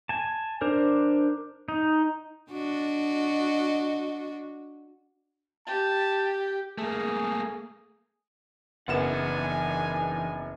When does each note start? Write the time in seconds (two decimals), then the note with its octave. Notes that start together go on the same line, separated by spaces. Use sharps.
0.09 G#5 A5
0.61 D4 A#4 C5
1.68 D#4
2.51 D4 F#4 D#5
5.67 G4 A5
6.78 A3 A#3 G#4
8.88 F#1 E2 B3 D4 D#4 F#5 G#5 E7